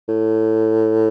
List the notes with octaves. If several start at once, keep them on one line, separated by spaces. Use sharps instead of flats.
A2